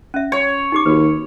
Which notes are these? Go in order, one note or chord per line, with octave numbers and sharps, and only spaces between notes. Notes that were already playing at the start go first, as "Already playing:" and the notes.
C#4 E5
C#5
D#4 G4 D6
D#2 F#4 B4